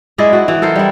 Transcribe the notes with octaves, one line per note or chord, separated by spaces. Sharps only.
G#3 E4 D5 D#5
F#4
E3
A4 A#4 C5
G3 E4